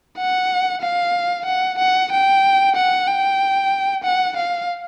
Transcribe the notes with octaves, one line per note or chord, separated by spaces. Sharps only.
F#5
F5
F#5
F#5
G5
F#5
G5
F#5
F5